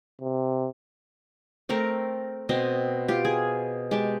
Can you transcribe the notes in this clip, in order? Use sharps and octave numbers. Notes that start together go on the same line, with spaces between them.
C3
A3 C4 A4 A#4
B2 C4 D#5
F4 G4
G#4
G#3 G4 A5